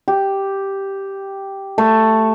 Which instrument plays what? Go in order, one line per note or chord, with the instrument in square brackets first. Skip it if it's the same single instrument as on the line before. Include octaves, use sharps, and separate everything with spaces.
[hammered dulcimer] G4
A3